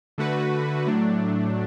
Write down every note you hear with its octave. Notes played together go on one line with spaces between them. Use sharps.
D3 A3 F#4 B4
A2 F#3 A3 D4